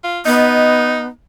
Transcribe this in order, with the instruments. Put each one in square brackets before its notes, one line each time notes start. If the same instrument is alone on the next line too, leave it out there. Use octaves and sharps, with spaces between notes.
[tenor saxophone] F4
[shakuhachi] B3 [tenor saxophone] D#4 [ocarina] D#5